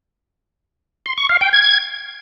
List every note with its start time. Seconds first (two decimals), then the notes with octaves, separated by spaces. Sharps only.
1.06 C6
1.18 C#6
1.29 F5
1.41 G5
1.53 G#6